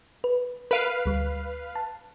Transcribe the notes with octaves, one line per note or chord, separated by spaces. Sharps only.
B4
A#4 B4 F5 D7 D#7
D2 G3
A5